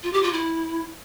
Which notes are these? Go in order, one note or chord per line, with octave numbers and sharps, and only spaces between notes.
F4
G4
F4
E4